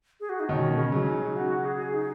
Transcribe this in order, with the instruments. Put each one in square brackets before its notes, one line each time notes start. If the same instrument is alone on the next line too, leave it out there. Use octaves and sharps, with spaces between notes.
[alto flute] G#4
F#4
D#4
[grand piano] B2 D#3 [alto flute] C#4
[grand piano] B2
C#3
C#3 F#3
[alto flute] D#4
F#4
G#4
D#4